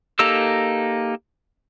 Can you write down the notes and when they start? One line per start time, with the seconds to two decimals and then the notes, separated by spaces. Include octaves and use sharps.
0.19 A#3 D#4 G4 A4 E6